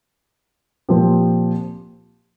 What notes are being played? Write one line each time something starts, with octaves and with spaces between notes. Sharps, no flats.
A#2 F3 C4 G4